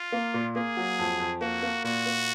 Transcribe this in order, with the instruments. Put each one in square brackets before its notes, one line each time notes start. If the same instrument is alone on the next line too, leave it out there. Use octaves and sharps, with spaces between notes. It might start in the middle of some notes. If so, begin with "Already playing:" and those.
Already playing: [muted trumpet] F4
[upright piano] A#3
A#2
[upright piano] A#3 [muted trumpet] G#4
[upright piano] F#3
F2
F2
[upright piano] A#3 [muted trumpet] F#4
[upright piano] A#3
[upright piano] A#2 [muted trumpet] F#4
[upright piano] A#3